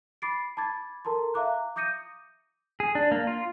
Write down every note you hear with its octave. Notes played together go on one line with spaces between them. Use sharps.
B5 D6 A6 C7 D7
A5 B5 D6 G#6 A6
A4 A#4 A5 A#5 C6
E5 F5 A#5 D6 F#6
D6 D#6 G6 A#6 C#7 D#7
G#4
D4
A#3
F4